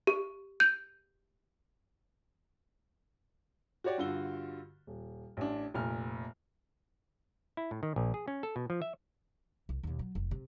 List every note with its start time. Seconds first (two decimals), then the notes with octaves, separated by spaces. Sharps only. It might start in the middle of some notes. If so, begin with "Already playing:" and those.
0.07 G4
0.60 G6
3.84 F#4 G4 C#5 D5
3.98 G2 D3 F4 F#4 E6 G7
4.87 D#1
5.37 A1 D4
5.74 F1 A#2 F6
7.57 E4
7.71 A2
7.83 D#3
7.96 A#1
8.14 G#4
8.28 C#4
8.43 A4
8.56 B2
8.70 F3
8.82 E5
9.69 C2
9.83 D#2 B2
9.99 F#3
10.15 F1
10.31 C3